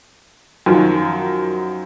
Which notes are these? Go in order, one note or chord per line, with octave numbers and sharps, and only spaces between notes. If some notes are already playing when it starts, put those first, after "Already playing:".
F#2 D#3 F3